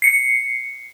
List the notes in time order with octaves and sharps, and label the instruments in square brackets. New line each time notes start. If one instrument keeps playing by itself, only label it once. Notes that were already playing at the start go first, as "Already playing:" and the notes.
[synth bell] C7 C#7